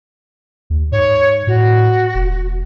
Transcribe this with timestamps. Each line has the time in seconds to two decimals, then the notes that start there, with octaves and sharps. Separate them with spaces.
0.70 D#2
0.92 G#2 C#5
1.47 A2 F#4
2.15 E1